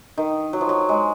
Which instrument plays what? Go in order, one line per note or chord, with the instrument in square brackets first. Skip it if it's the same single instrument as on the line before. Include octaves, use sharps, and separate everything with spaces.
[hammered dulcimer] D#3
F#3
F3
F#3
G#3